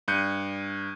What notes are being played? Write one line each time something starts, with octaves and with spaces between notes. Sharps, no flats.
G2 F#6 G6 C#7 D#7